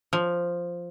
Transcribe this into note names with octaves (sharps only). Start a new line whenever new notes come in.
F3